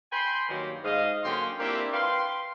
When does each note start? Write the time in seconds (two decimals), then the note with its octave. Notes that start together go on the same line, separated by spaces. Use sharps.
0.12 G5 G#5 B5 C6
0.49 G2 D#3 F#3 A#3 G4 A#4
0.84 G#2 D#5 F5
1.25 D3 F#3 A#3 C#4 G5 C6
1.59 A#3 C4 D4 E4 F4 G4
1.92 B4 F5 G5 C6